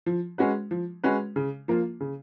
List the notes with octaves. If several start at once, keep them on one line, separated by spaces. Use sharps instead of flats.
F3
G#3 C#4 F#4 B4
F3
G#3 C#4 F#4 B4
C#3
F3 A#3 F4
C#3